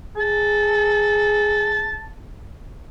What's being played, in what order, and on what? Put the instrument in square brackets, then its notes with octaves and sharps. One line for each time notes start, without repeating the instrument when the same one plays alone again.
[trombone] G#4 [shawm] A5